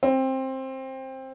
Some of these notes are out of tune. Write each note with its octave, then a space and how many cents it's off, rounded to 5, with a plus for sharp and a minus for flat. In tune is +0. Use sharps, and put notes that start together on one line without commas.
C4 +15